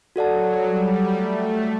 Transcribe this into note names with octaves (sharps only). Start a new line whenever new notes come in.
F#3 F#4 A4 D5 F#5 A5
G3
A3